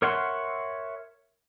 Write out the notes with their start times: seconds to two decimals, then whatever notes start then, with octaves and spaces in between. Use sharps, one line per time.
0.02 A#4 C#5 E5 F#5 C6